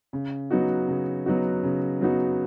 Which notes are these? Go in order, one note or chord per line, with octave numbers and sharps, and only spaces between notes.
C#3
F#3 B3 D#4 F#4
C#3
F#3 B3 D#4 F#4
C#3
F#3 B3 D#4 F#4